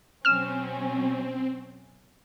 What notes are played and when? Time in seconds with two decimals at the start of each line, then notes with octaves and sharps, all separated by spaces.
0.25 B2 F#3 C4 C#4 F6 E7